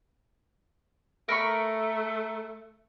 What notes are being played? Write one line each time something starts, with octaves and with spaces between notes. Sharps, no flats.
A3 A#4 B5 C#6